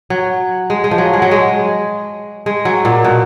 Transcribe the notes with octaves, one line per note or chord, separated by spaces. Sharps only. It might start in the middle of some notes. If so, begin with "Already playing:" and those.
F#3
G#3
G#3
F3
F#3
G#3
F#3
G#3
G#3
F#3
A#2
B2